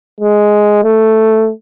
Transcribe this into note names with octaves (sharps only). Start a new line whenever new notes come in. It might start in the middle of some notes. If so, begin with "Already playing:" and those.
G#3
A3